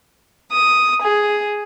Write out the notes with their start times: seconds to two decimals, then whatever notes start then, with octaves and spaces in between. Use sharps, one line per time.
0.51 D#6
1.02 G#4